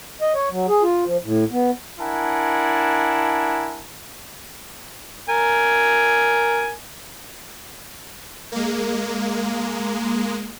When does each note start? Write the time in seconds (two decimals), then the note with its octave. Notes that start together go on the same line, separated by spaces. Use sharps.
0.21 D#5
0.35 C#5
0.51 F#3
0.69 G#4
0.83 F4
1.05 F3
1.24 A2
1.51 B3
1.99 D4 E4 A#4 F#5 G#5 A5
5.29 A#4 G#5
8.52 G#3 A#3